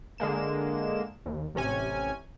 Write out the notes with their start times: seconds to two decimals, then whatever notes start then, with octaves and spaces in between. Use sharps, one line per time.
0.18 D3 G#3 A#3 E7
1.26 D#2
1.55 A1 C3 C#4 G#5